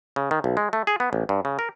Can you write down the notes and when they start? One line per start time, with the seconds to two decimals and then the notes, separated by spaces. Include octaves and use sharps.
0.16 C#3
0.31 D#3
0.44 B1
0.57 G#3
0.73 A3
0.87 G#4
1.00 B3
1.13 A1
1.29 G2
1.45 C#3
1.59 A#4